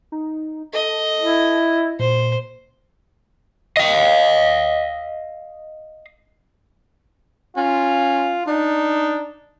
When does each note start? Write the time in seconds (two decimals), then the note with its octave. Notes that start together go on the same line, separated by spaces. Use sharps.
0.12 D#4
0.73 A4 D#5
1.22 E4
1.99 A#2 C5
3.77 D#5 F5
7.57 C#4 F4
8.47 D4 D#4